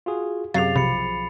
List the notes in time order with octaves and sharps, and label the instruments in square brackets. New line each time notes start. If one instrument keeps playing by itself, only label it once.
[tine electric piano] F4 F#4 G#4
[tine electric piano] F#2 C3 [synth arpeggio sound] F#3 [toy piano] G#4 F5 [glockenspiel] A6 C7 F7
[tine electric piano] B1 F3 [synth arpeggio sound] C3 [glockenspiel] B5 C#7